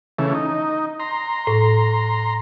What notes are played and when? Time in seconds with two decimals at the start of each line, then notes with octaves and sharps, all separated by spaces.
0.18 C#3 E3 A3
0.35 D#4
1.00 A#5 C6
1.47 A2